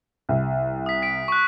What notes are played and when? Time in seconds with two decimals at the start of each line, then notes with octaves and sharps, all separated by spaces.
0.29 C2
0.86 D#6 B6
1.02 B6 D7
1.28 C#6 F#6